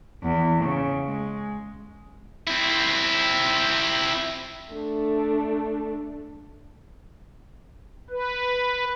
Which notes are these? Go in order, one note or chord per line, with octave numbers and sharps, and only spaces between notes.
E2
C#3
G#3
C4 E4
A3 D4
B4